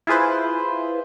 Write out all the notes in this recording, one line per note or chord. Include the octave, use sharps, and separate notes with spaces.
E4 F4 G#4 B4 C5